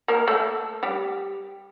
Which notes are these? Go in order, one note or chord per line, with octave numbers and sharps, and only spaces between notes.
A#3 A#4
A3 A4
G3 G4